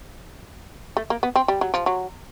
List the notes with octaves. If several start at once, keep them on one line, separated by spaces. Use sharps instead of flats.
A3
A#3
B3
C4
G3
F#3
F3
F#3